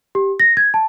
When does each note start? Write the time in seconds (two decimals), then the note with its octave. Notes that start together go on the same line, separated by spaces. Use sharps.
0.15 G4
0.40 A#6
0.57 G#6
0.74 A5